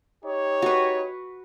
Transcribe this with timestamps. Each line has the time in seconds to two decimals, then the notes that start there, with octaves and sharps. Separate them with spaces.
0.23 D#4 G4 C#5
0.62 F#4 B4